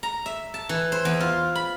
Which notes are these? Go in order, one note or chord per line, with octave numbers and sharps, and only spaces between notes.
A#5
E5
A5
E3
C5
E2
F4
B5